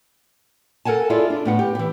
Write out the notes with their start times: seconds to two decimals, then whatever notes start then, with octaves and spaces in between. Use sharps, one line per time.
0.85 A4 A#4 F#5 G#5 A5
1.10 E4 F4 G#4 A4 D5
1.30 D4
1.45 A2 B3 F#5
1.59 G4
1.75 E3 G4